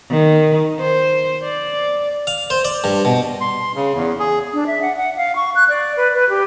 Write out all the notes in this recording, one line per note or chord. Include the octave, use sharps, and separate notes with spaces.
D#3
C5
D5
F5
C5
D5
G2
B2
C6
C#3
E2
G#4
D4
E5
F#5
F#5
F5
C#6
F#6
D5
B4
B4
G4